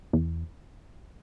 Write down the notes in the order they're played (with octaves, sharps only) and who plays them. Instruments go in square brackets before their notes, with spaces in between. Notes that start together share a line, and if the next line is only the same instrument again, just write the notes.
[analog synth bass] E2